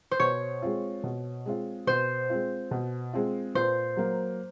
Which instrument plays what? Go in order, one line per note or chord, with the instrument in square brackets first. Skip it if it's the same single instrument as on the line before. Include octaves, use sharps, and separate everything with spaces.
[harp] C5
[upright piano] B2 [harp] C#5
[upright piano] G#3 C4 F4
B2
G#3 C4 F4
[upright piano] B2 [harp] C5
[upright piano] G#3 C4 F4
B2
G#3 C4 F4
[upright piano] A#2 [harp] C5
[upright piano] F#3 A#3